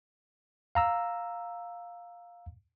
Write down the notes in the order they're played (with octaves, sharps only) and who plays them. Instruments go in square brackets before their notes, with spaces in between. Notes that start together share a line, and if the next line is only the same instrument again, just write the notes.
[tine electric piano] F5 A#5 E6